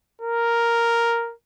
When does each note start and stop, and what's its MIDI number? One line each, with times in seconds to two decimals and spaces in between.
0.22 1.34 70